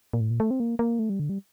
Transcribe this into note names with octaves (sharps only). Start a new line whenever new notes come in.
A#2
A2
A#2
A3
C4
A#3
A#3
A3
G3
D3
G3